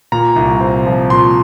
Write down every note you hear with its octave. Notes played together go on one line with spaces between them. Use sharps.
A#2 A#5
C2
C4
F3
A#2 C6